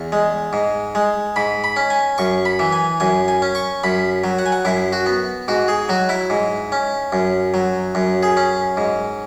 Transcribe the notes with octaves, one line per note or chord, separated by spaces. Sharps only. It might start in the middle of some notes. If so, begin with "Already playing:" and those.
Already playing: E2
G#3
G#2
G#3
G#2 B5
B5
C#4
G#5
F#2 C#6
B5
E3
G#5
F#2 G#5
G#5
C#4
C#6
F#2 B5
F#3
F#5
G#5
F#5
F#2 E4
F#4
B3
G#2 F#4
G#4
F#3 F#4
E4
G#2
C#4
F#2
F#3
F#2
G#4
C#4
G#2